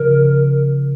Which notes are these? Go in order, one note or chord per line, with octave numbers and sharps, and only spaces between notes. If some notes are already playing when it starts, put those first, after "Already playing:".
Already playing: C#3 F3 A#4